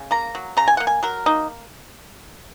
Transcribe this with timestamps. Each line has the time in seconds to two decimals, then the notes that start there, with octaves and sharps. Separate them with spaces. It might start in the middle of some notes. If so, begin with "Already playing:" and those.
Already playing: C#3
0.11 A#3 A#5
0.35 F#3
0.57 C#3 A#5
0.68 G#5
0.77 A#3 F#5
0.87 G#5
1.03 F#3 A#4
1.26 A#3 D#4